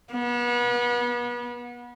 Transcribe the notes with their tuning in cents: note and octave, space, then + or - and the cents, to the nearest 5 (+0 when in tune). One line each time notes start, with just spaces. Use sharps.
B3 -35